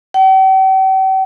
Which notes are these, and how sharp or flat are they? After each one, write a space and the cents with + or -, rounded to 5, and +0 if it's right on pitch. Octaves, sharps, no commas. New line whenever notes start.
G5 -45